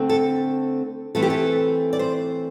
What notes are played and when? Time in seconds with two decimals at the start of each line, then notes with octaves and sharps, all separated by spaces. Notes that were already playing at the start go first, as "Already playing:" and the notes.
Already playing: D3 A3 C4
0.09 A4
1.15 E3 A3 C4 A4
1.22 G4
1.30 A4
1.93 D5
1.99 C5